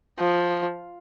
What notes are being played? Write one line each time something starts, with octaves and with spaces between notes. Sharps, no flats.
F3